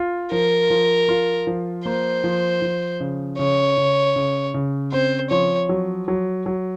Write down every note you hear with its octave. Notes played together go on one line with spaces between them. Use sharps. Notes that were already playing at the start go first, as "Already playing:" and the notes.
Already playing: F4
F3 A#4
F3
F4
F3
A#3 C5
F3
F3
C#3
C#3 C#5
C#3
C#3
C#3
C4 C5
F3 C#5
F#3
F#3
F#3